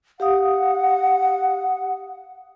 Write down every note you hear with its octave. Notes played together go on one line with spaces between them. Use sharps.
G4 F5 F#5 D#6